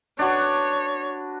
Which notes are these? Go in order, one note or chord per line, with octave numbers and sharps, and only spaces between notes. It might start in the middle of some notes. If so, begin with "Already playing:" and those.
D4 F#4 B4 C#5